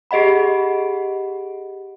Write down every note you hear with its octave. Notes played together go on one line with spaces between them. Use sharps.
G4 G#4 D#5 F#5 B5